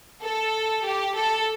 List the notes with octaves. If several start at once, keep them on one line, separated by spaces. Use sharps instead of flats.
A4
G4
A4